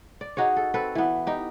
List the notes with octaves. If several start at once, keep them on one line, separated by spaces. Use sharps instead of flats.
D5
D#4 F#4 G#4 C#5
A4
C4 A4 B4
E3 B3
D#4 G4